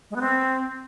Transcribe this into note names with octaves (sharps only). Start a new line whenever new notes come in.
G#3
B3
C4